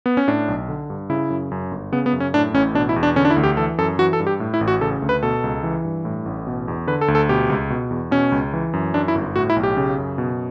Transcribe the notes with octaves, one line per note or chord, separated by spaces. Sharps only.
B3
C#4
A2 D4
B1
D3
G2
C#3 E4
F#2
F#2
G1
C#3 B3
B3
F#2
C#4
A2 D4
A1 C#4
B2 D4
E4
E2
D4
D3 C#4
D4
E4
D2
G4
E3 A4
F#2 A4
E3 F#4
A4
G2
G4
A2
E4
A1
F#4
C#3 A4
D2
B4
B2 A4
C#2
E3
G2
A2
A1
B2
E2
D3 B4
A4
D2
A4
B2 G4
C#2
B2
E2
B2 C#4
C#2
E3
F#2
F#2 D4
E4
G1
A2 F#4
E4
B1
G4
C#3
F#2
B2